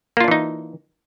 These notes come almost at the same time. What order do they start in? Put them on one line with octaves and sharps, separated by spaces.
A#3 F4 D4 E3 D#4